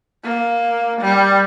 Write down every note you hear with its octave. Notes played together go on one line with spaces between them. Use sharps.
A#3
G3